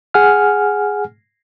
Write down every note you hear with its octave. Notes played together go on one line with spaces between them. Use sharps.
G#4 F#5 G#5 F6